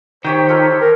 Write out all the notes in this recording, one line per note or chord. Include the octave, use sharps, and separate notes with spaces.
D#3 G4 C5 C#5 G5
F4 A4 A#4
A#4